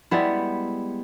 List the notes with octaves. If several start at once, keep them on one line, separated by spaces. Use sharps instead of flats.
G3 G#3 B3 E4